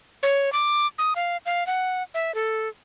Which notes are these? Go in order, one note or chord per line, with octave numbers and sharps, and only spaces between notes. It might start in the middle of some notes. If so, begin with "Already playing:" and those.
C#5
D6
D#6
F5
F5
F#5
E5
A4